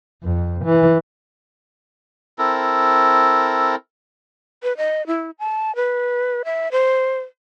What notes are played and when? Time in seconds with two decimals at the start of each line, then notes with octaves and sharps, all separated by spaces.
0.24 F2
0.65 E3
2.38 C4 E4 A4 A#4
4.63 B4
4.77 D#5
5.07 E4
5.39 A5
5.76 B4
6.45 E5
6.72 C5